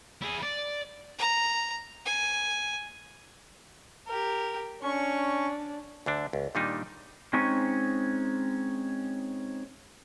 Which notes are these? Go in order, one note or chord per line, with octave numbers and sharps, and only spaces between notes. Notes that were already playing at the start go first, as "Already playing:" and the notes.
E4 G#4
D5
A#5
G#5
G4 A#4
C#4 D4 C#6
D2 D3 D4
C#2
A#2 D#3 G3 D4 D#4
G#3 C4 C#4 D#4 C#6